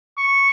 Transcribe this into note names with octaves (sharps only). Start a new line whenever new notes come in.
C#6